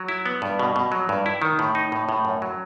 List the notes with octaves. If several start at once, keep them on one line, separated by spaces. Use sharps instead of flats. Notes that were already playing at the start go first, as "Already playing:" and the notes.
Already playing: F#3
E4
B3
G2
B2
B2
F#3
G2
E4
D#3
A2
D#4
A2
A2
F#2
F#3